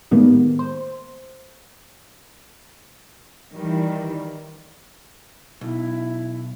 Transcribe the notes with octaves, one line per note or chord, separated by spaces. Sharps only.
A2 D#3 G3 G#3 A#3 B3
C5
D#3 E3 G3
B1 E4